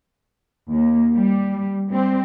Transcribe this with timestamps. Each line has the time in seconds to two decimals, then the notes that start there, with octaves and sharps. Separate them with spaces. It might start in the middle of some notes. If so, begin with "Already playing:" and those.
0.70 D#2 A#3
1.15 G3
1.89 G3 C4